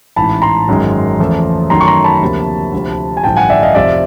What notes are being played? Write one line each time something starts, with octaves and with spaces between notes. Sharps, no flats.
A1 G#2 E3 A5 B5
A#5 C6
G#1 F#2 D#3 G#3
E2 C#3 F3 A3
F#2 D#3 F#3 A3 A#5 C6
C#6
A#5 C6
A5 B5
D2 C3 F3 A#3
D2 C3 F3
G#5
A1 G2 D3 F3 G5 A5
F#5 G#5
D5 E5
D#5 F5
F1 F2 C3 F3 D5 E5